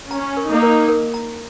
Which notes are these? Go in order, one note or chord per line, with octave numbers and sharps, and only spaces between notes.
C#4 A#5
A#4
A#3 D#4
A#4
A#4
A#5